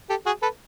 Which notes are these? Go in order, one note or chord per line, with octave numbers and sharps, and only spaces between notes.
G4 A4
F#4 G#4
A4 B4